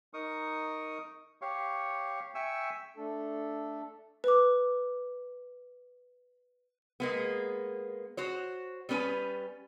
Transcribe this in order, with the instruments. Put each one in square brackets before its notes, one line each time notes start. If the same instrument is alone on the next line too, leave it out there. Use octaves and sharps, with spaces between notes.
[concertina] D#4 A#4 C#6 D#6
G4 C#5 F5 C#6
E5 G5 G#5 C#6 E6
[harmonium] A3 D4 A4
[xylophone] B4 D6
[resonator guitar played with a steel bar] G#3 A#3 B3
F#4 C5 C#5
G3 B3 C#4 B4 G#5